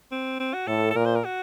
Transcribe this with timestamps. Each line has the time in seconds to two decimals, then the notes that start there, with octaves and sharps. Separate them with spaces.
0.11 C4
0.40 C4
0.54 F#4
0.67 A2 A4
0.91 A4
0.95 A#2 A#4
1.06 C5
1.15 A#4
1.24 F#4